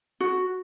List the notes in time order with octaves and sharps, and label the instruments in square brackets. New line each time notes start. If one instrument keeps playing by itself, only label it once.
[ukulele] F#4